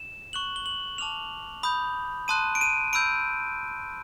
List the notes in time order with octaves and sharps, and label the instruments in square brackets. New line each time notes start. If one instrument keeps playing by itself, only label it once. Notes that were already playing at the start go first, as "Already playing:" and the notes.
Already playing: [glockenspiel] E7
C#6 F#6 F#7
G7
F#7
A5 D6 F6 F7
B5 D#6 G6
A5 C6 D#6 F#6 D#7
D7
D#7
B5 E6 G6 D7